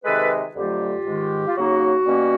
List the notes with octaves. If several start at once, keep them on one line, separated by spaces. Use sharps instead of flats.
C3 D#3 G#3 A4 B4
F2 D3 F#3 A3 F4 G4
G#2 D#3 G#3
F4
C#3 F#3 A#3 D#4 F#4
B2 G3 A#3 C#4